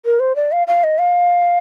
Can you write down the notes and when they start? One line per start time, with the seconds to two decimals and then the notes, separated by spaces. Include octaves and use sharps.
0.05 A#4
0.20 C5
0.36 D5
0.52 F5
0.67 F5
0.84 D#5
0.98 F5